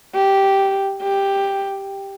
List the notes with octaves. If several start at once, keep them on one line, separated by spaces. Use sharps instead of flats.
G4
G4